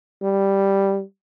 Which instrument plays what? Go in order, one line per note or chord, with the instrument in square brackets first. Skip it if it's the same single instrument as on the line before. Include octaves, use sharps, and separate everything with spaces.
[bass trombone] G3